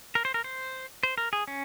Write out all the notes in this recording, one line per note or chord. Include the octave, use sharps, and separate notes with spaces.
A#4
C5
A#4
C5
C5
A#4
G#4
C#4